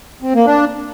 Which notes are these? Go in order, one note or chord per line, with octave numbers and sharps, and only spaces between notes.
C4
A#3
D4